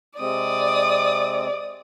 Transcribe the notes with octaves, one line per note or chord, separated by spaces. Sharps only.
C3 G#3 C4 D5 D#6